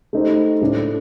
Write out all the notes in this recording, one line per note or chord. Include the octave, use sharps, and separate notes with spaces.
A3 D#4 G4 C5
A2 A3 D4